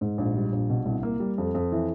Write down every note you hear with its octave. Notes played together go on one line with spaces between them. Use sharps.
G#2
A#1
G3
A#1
B2
C2
A#3
G3
F2
F2
E3